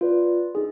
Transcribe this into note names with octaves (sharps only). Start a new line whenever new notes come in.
F4 B4 D5
D#4 G#4